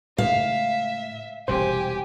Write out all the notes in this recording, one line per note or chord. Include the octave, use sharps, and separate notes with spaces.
A2 C#3 G#3 E5 F5
E1 C2 B2 G4 C5 G#5